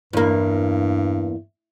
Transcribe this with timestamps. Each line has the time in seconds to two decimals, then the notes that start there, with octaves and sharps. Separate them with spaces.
0.13 E2 G2 A#3